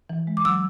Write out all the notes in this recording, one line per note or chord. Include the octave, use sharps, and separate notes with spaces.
E3
G#3
D6
F#3 E6